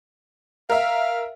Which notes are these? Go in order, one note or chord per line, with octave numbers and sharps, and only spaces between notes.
A#4 E5 F5